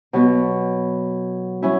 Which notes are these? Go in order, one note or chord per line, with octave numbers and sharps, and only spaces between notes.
B2 F#3 B3 F#4
F#3 C#4 E4